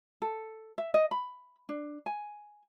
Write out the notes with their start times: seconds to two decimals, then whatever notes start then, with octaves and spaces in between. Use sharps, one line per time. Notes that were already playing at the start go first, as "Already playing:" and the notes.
0.22 A4
0.78 E5
0.94 D#5
1.11 B5
1.69 D4
2.06 G#5